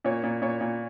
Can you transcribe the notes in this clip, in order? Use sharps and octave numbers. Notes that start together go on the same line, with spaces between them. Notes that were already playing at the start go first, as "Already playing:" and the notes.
A#2 C#5
A#2
A#2 C#5
A#2